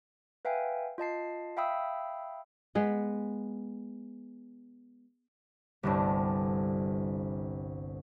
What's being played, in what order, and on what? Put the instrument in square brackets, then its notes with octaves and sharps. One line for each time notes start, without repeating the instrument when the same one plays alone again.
[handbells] B4 E5 F5 G5 G#5
F4 D#5 A5 C7
E5 F5 G5 B5 D#6 E6
[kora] G#3 B3 B4
[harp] G1 C2 G2